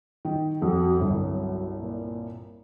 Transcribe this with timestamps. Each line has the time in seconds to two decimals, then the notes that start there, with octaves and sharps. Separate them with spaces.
0.25 D#3
0.62 F2 F#4
0.99 G1 C2 F#3
1.79 A#2